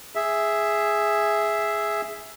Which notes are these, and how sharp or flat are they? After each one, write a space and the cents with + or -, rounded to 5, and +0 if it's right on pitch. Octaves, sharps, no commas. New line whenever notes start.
G#4 +0 E5 +0